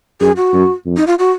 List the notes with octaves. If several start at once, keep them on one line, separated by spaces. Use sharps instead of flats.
F#2 G#4
F#4
F#2
F2
D#4
F4
F#4